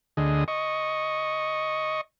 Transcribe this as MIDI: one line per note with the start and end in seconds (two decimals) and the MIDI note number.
0.17 0.44 38
0.17 0.44 50
0.17 0.44 68
0.17 0.44 75
0.48 2.01 75
0.48 2.01 85